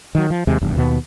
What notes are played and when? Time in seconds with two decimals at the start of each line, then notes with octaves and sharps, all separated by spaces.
0.15 D#3 F#3
0.30 F3
0.47 D#2 C3 G#3
0.61 F1 E2 G2
0.76 D#2 B2 B3